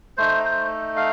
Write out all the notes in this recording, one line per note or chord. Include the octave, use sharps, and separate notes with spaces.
A3 D#4 C5
C5
F5